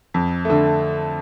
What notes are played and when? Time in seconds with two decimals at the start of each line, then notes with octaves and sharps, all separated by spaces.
0.14 F2
0.45 D3 A3